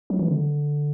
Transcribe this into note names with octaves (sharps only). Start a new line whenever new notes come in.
F#3
E3
D3